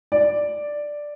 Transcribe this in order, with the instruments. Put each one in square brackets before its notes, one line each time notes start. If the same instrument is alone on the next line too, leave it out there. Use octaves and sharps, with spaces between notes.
[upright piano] D5